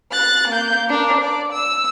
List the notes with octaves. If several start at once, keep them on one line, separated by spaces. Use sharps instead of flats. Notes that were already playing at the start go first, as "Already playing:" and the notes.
F#6 A6
A#3 G6
D4 A#4
D5
E6